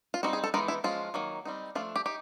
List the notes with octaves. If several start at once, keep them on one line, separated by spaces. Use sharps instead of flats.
F4
G3 C4 D#4 F#4
G#4
A4
E3 G#3 B3 D#4 A#4
E4
F3 G#3 C#4 F4
D#3 F#3 A#3
G3 C4 D#4
F3 A3 D4 F4
G4
D#4 G4